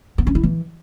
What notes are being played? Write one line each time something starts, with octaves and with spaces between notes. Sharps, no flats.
B3
C#4
E4
E3